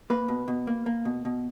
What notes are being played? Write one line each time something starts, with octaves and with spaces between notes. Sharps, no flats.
A#3 B4
B2
B2
A#3
A#3
B2
B2